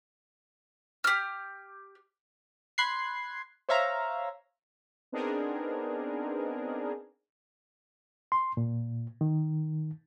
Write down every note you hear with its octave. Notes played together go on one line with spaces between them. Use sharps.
G4 F6
B5 C6 F#6 G#6 C7
C5 C#5 E5 F5 A#5
B3 C4 D4 D#4 G#4 A#4
C6
A#2
D#3